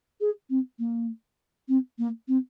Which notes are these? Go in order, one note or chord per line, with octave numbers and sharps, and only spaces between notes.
G#4
C4
A#3
C4
A#3
C4